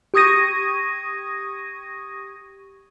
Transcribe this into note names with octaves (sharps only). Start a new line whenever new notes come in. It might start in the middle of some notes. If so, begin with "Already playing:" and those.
G4 C#6 D#6 G#6 A#6 D#7